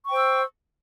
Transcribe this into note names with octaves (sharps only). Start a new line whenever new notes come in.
C5 G5 C#6 E6